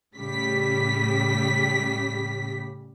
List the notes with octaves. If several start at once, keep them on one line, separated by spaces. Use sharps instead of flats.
A2 C#3 G3 B6